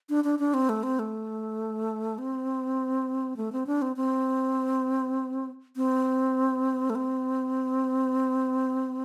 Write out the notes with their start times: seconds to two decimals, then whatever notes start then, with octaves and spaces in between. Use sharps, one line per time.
0.09 D4
0.24 D4
0.39 D4
0.54 C4
0.69 A3
0.83 C4
0.99 A3
2.18 C4
3.37 A3
3.52 C4
3.67 D4
3.82 C4
3.96 C4
5.76 C4
6.90 A3
6.95 C4